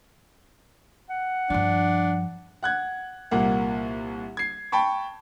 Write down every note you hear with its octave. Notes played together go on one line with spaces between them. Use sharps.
F#5
G2 F3 D4
F#5 F#6 G#6
C2 A#2 A#3 F#5
G#6 C7
G5 A5 B5 C#6